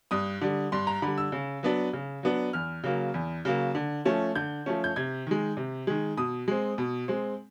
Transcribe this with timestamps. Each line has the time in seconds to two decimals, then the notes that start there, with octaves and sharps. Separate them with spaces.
0.11 G2 D#6
0.41 D3 G3
0.72 G2 C6
0.87 A#5
1.02 D3 G3 B5
1.18 E6
1.32 C#3
1.63 F#3 B3 D4
1.93 C#3
2.23 F#3 B3 D4
2.53 E2 F6
2.84 C#3 F#3 A#3
3.14 E2
3.45 C#3 F#3 A#3
3.75 D3
4.05 F3 A3 C#4
4.35 D3 G6
4.66 F3 A3 C#4
4.84 G6
4.96 C3 G#6
5.27 D#3 G#3
5.57 C3
5.87 D#3 G#3
6.17 B2 D#6
6.48 G#3 C4
6.78 B2
7.08 G#3 C4